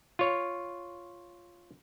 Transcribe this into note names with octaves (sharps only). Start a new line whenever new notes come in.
F4 C#5